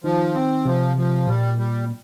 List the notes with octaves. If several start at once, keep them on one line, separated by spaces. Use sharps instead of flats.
D#3 F3
C4
C3 F3
F3
A#2 G3
G3